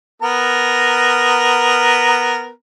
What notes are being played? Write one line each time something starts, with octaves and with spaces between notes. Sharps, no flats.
B3 A#4 A#5